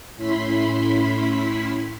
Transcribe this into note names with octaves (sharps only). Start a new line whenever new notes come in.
A2 C#4 E4 B5 C6 B6